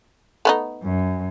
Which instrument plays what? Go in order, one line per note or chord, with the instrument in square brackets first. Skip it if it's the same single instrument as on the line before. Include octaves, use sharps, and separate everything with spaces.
[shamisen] A3 B3 D#4
[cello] F#2